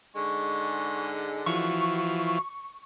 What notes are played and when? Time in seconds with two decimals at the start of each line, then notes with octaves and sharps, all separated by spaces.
0.15 G#2 D3 G#3 C#6
1.46 E3 F3 F#4 C#6